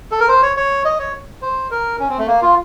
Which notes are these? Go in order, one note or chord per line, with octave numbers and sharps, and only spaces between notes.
A4
A#4
C5
C#5
C#5
D#5
C#5
C5
A#4
C#4
C4
A3
A#3
F4